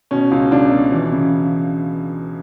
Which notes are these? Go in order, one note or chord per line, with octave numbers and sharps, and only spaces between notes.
B2 C#4
C#2
C#2 D4
B2
E3
C#3